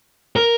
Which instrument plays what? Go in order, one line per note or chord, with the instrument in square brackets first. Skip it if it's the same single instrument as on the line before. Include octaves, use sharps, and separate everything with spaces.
[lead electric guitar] A#4